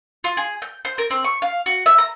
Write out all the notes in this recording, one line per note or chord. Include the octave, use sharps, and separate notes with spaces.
F4
G#4
G6
C5
A#4
C4
C#6
F5
F#4
E5
A#5